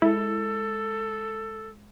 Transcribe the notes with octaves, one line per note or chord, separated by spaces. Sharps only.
G#3 E4 A4